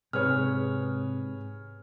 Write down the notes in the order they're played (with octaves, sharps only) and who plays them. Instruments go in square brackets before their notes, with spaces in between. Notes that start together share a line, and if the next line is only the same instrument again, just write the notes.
[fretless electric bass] G#2 C3 [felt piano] G#4 B4 C#5 [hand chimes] F6